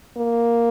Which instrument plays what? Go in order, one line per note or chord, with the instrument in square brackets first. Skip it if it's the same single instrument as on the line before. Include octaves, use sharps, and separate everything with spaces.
[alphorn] A#3